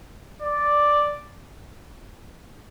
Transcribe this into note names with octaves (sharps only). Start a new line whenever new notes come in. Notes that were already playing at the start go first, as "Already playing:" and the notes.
D5